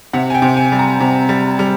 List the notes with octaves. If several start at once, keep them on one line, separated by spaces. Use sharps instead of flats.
C3 F#5
G#5
G5
C3
G#5
G3
A#5
C3
G3
G3